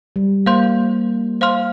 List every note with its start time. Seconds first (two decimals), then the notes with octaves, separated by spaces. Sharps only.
0.16 G3
0.46 A#3 C5 F5 C6 G6
1.41 C5 F5 C6 F6